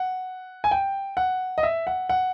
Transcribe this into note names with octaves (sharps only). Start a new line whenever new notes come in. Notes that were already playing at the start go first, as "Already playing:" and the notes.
Already playing: F#5
G#5
G5
F#5
D#5
E5
F#5
F#5